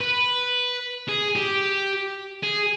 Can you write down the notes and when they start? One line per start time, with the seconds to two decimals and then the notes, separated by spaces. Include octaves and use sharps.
0.01 B4
1.09 G#4
1.36 G4
2.43 G#4